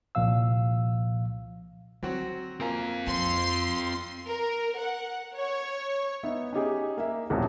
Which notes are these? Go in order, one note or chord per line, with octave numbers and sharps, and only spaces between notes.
C2 A#2 F3 F5 E6
D3 F#3 C4 F#4
A#3 C4 F4 G#5 A#5
F2 C6
A#4
F#5
C#5
B3 D#4 E5
C#4 D#4 G4 G#4
A#3 E5
D#1 A#1 B2 F3 F#4